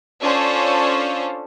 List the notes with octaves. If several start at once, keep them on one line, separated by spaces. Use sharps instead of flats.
C#4 D4 F4 A4 C5 C#5